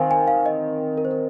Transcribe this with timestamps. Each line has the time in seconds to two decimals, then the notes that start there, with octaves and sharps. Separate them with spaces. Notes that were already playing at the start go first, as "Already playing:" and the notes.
Already playing: D#3 C4 A#4 C5 F5 G#5
0.11 G#5
0.28 F5
0.46 D#5
0.98 A#4
1.05 C5
1.11 A#4